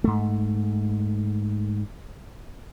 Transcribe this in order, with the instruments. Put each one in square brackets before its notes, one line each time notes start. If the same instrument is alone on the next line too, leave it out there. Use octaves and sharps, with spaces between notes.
[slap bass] G#2 A3